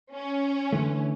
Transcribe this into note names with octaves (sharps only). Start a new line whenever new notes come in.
C#4
D3 E3 A3